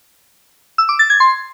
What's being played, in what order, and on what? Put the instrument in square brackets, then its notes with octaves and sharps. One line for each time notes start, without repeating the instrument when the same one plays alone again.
[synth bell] E6
D6
A6
G#6
C6